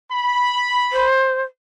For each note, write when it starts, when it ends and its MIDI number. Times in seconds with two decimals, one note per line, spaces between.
0.11 1.06 83
0.92 1.42 72